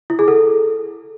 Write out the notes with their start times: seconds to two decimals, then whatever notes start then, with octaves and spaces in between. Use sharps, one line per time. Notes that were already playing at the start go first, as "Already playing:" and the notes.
0.10 E4
0.19 G#4
0.28 A4